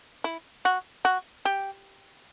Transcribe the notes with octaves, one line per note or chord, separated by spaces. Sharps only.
E4
F#4
F#4
G4